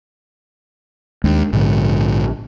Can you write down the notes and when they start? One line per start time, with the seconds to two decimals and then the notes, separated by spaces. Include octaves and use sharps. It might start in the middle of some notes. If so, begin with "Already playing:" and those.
1.24 D#2 G#3 D4
1.53 A#1 G#2 D3